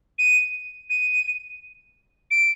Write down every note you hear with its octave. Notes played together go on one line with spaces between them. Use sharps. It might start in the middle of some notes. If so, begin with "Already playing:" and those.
D#7
D#7
D7